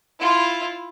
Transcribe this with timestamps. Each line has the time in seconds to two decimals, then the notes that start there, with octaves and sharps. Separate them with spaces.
0.19 E4 F4